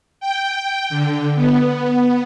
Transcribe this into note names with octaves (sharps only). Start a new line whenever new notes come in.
G5
D3
B3